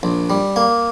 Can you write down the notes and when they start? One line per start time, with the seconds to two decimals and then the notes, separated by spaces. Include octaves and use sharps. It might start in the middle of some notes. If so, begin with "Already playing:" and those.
0.03 A#1
0.30 G3
0.56 A#3